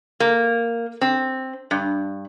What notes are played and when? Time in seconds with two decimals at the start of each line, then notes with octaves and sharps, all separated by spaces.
0.20 A#3
1.01 C4
1.71 G2